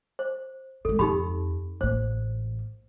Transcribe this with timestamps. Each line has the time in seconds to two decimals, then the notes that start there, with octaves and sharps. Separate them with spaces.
0.19 C5
0.85 F2 G#3 A4
0.99 F2 D#4 G4 B5
1.81 A1 A#3 C5